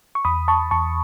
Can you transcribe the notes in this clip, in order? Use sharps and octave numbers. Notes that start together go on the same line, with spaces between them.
C#6
E2 B5 D#6
A5 C#6
E2 A5 C#6